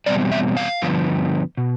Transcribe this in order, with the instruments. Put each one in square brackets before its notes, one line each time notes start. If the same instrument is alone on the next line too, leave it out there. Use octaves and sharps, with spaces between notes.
[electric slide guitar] E2 B2 G3 C4 D5
E5
F5
G2 D3 F3 B3
B2